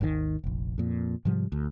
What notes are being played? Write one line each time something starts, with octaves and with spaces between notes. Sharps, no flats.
G#1 D#2 C3 D#3
F1 A#1
F2 A#2
G#2 C3 F3 G3
D2